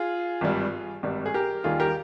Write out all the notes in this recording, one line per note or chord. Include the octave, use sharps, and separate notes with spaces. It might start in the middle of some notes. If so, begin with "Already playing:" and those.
Already playing: F4 G#4
G#1 G2 G3
G#1 G2 G3
G#4
G4 A#4
D#2 D#3 G3 F4 G#4
G4 A#4